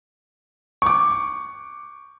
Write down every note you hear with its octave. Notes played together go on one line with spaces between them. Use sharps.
C#6 D6